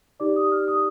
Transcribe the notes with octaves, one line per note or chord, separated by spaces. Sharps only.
D#4 G4 D5 D6
D#6
F6
D#6